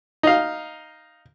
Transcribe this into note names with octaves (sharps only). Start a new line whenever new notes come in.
D#4 F5